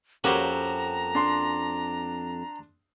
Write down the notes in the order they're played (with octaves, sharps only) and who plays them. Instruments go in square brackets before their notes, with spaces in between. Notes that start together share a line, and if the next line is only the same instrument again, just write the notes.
[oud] F2 A#3 C#4 [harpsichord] F#4 G4 C5 [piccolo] A#5
[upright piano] D4 C6